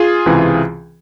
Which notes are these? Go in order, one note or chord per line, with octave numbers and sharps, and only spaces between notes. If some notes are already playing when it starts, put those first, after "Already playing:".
Already playing: F4 G#4
C#2 C3 E3